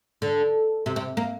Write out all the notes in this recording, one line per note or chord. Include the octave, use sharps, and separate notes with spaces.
D3
C3
C3
A#3